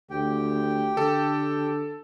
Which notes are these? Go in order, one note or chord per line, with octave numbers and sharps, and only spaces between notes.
D2 G4 G5
D3 A4